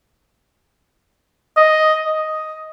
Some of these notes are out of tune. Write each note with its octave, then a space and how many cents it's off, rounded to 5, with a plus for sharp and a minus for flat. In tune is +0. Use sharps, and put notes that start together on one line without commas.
D#5 +5
D#5 +5